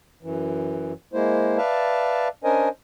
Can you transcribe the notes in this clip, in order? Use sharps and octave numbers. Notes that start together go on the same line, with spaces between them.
F#2 E3
G#3 A#3 E4 C5
B4 D5 E5 F5 A5
C#4 D4 A#4 C5 D#5 G#5